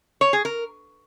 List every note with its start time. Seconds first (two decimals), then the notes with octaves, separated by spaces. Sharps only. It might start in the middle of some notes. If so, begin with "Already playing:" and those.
0.21 C#5
0.33 G#4
0.45 A#4